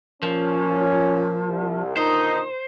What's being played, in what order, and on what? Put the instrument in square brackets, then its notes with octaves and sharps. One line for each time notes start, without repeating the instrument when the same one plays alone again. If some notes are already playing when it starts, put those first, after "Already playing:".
[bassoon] A#2 [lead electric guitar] F3 [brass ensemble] C#4
[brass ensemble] C2
[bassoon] A#2 [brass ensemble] D3 D#3 D#4 [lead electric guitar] C5